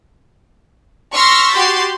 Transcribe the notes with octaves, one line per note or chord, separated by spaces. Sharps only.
C6 C#6 E6 F6 A#6 B6
F#4 G4 C6 G6 A6